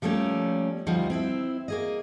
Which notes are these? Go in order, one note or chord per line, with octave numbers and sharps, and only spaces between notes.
F3 G3 A3 A#3 C#4
D2 F3 G3 D#4
C4 E4 E5
A#3 G#4 D#5